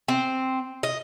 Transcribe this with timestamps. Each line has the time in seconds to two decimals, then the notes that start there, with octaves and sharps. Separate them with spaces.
0.08 C4
0.83 D#5